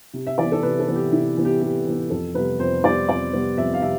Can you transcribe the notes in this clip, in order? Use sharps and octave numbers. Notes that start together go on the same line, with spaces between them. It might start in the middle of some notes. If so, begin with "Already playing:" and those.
C3
E5
E3 B3 D5
A4
C3 B4
A4
E3 B3
G4
C3 E4
E3 B3
G4
C3 G4
E3 B3
F2 A4
C3 G3 B3 B4
F2 C5
C3 G3 B3 D5
F2 D5
C3 G3 B3
F2 E5
F5
C3 E5